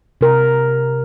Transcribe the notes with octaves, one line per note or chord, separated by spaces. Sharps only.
C3 A#4